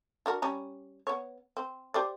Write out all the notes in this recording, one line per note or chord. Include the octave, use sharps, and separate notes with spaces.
D4 F#4 A#4
G3 C#4 A#5
B3 C#5
C4
G4 C5 D5